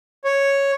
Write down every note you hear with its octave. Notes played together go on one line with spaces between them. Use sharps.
C#5